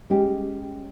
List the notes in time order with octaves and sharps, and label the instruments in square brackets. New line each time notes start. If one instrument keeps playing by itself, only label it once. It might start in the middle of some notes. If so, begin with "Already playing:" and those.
[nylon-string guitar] G#3 C#4 G4